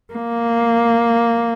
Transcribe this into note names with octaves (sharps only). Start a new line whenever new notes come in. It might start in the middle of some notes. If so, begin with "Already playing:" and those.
A#3